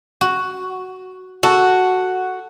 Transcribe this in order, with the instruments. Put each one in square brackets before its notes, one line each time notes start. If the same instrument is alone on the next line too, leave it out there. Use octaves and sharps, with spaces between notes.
[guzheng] F#4
[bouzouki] F#4 [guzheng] A4